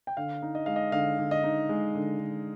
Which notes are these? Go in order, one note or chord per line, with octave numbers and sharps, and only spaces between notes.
G5
D3 F5
D#4
D#5
G#3 F5
D#5
D3 F5
D3
D#5
D#4
G#3
D3
D3